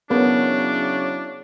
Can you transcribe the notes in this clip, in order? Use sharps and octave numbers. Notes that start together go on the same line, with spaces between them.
C#3 F#3 B3 D4 E4 A#4 C#5